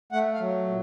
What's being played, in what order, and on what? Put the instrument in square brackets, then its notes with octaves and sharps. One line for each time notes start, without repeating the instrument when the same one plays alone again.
[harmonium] A3 F#5
F5
F#3
A#2